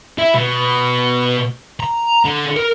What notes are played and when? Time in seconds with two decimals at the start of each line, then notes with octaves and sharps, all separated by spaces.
0.18 E4
0.35 B2
1.80 A#5
2.25 D3
2.56 A#4